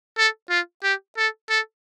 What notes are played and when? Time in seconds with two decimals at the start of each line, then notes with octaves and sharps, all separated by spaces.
0.18 A4
0.50 F4
0.83 G4
1.17 A4
1.49 A4